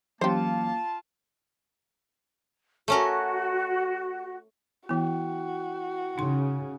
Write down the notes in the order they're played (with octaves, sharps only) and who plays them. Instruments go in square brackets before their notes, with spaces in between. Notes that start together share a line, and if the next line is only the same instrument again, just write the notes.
[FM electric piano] E3 F#3 C#4 [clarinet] A#3 [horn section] F4 A5 [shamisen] G4 C5
[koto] A3 C#4 A#4 [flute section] F#4
[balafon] E3 B3 [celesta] E4 G5 [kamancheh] F#4
[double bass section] C#3 [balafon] D#4 C6